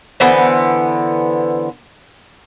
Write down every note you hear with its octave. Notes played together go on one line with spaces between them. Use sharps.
D3 E3 B3 C5